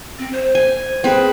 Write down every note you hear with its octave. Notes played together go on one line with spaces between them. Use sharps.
C4
C5
G#5
C4 G#4 B4